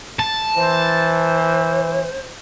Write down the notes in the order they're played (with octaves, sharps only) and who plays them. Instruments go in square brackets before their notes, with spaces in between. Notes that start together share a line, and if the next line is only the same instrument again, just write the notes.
[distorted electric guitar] A5
[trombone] E3 [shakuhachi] C5